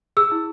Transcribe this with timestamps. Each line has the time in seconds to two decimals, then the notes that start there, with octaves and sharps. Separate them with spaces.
0.17 G#4 E6
0.31 E4